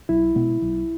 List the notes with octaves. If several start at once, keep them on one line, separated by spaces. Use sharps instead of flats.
B1 E4
B2 G#3 B3
B1